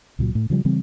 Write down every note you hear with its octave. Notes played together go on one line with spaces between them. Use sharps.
C#2 A#2 F#3
A2
C#3 F3 G3
C#3 E3 G3 C4